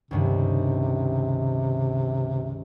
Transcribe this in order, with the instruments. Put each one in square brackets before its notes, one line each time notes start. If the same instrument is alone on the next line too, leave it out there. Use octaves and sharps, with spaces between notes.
[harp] C#2 G2 D#3 [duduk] C3